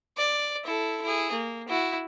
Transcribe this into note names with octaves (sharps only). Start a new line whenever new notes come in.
D5
E4 A4
E4 G#4
A#3
E4 F#4